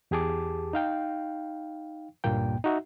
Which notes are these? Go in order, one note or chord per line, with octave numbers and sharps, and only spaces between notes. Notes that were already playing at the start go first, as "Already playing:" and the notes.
E2 G4 G#4 A5 D6
D#4 F5 G5
C#2 G2 A#2 A#3 G5
D#4 F#4 E5